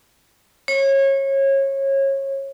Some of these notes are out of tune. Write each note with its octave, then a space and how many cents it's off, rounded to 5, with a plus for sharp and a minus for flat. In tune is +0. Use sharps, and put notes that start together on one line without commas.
C#5 -25